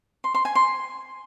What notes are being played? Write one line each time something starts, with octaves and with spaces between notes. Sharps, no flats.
C6
C6
G#5
C6